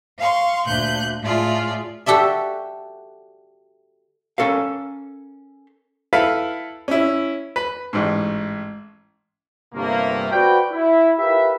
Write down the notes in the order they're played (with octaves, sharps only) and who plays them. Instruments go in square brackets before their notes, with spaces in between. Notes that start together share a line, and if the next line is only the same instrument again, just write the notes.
[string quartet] F5 C6 C#6
D2 A#2 F#6 G6
A2 A3 F4 G#4 D5
[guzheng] F#4 G4 A4 D5 E5
[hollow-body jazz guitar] C#4 A4 A#4 F5
[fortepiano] E4 A4 B4 F5
C#4 E4
B4
A1 G#2
[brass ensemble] G1 C3 A3 A#3
F#4 B4 C5 D5 F#5 G5
E4
F4 G4 A#4 B4 E5